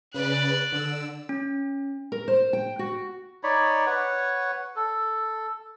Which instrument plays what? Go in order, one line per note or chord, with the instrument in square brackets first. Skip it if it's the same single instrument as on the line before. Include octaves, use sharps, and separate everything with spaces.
[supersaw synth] C#3 B4 [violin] D5 F#6
[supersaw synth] D3 E6
[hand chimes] C#4
[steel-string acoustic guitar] A#4
C5
G5
F#4
[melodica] D#4 C#5 D5 B5
B4 C#5 F#5
A4